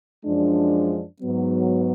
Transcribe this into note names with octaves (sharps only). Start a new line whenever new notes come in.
F#2 F3 G#3 D4
G#2 F#3 B3